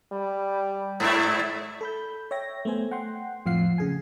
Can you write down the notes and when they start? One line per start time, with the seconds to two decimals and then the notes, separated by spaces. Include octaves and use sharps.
0.12 G3
1.00 G#2 E4
1.81 A4 B5 G6
2.31 C#5 E5 G5 A#6
2.65 A3 B3 C5 G#5
2.91 F#5 G5 C6
3.46 F2 A2 F3 F5 F#5 C7
3.78 C#3 G#4 G#5